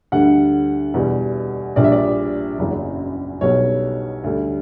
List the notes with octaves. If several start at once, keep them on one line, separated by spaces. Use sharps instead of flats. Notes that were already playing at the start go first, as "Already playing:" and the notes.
D2 D3 G3 F#5
E2 B2 G3
A#1 A#2 G3 D5
E5
D5
F#1 E2 C#3 F#3
B1 B2 G3 C#5
D2 D3 G3